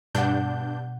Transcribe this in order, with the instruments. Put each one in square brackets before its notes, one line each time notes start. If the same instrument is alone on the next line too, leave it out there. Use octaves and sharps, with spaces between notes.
[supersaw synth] G2 D4 G6 [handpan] B2 F#5